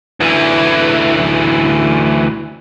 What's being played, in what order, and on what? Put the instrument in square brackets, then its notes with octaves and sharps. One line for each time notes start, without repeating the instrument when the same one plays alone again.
[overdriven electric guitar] D2 E3